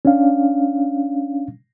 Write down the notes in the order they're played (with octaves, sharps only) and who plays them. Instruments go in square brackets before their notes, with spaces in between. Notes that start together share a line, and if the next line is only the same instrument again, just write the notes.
[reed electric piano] C#4 D4 F5